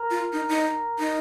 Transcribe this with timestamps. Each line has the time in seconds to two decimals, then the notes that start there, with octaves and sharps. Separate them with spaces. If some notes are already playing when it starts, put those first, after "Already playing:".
Already playing: A#4
0.10 F4
0.33 D#4
0.49 D#4
0.99 D#4